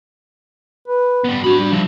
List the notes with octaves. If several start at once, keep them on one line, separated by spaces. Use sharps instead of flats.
B4
G3 B3
D4 F#4 B5
G3
F3 E5